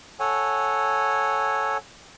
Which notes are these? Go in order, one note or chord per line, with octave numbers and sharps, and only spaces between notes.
A4 C#5 F#5 G#5